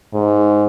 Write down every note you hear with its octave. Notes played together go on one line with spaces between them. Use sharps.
G#2